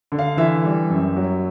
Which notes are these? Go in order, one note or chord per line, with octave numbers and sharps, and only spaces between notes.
D3
F5
E3 E5
G3
F#2
F#3